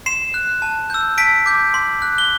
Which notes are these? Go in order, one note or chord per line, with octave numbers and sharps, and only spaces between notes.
C6 C7 E7
F#6
A5
E6 G6
A5 B6 D7
D6 G6
C6
F#6
G7